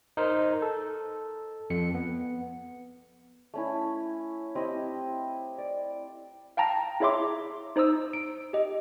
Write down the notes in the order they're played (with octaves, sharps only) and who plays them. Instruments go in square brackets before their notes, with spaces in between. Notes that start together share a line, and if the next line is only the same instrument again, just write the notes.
[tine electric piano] D#4 A#4 C5
A4
F2 C#7
B3
[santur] A3 C#4 E4
C4 E4 G4 D#5
D5
[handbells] F5 G5 A5 A#5 A#6
E4 G#4 C#5 E5 C6 D6
D#4 C5 A#5 D#6 E6
D7
G4 D#5